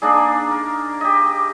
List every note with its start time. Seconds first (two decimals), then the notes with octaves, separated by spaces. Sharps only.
0.02 A#3 D4 D#4 G#4
0.51 A#4
1.01 G4 D#5